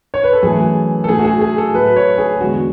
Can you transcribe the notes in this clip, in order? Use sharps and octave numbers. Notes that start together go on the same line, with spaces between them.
C#5
B4
A4
F#2 E3 A3 G#4
A4
A2 F#3 A3 G#4
F#4
G#4
G#4
A4
A2 F#3 A3 B4
C#5
G#4
E2 D3 G#3 F#4